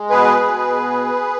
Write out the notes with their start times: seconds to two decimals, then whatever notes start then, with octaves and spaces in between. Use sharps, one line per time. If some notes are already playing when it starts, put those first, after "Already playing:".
Already playing: G#3
0.10 B2 G#4 B4
0.41 B2